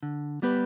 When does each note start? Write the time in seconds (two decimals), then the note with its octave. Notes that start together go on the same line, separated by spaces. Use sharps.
0.03 D3
0.42 G3 B3 G4 B4